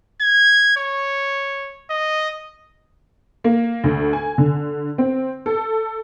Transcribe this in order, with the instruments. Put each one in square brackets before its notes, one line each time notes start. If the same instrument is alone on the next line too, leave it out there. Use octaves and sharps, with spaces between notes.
[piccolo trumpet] G#6
C#5
D#5
[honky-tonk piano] A#3
D2
G#5
D3
C4
A4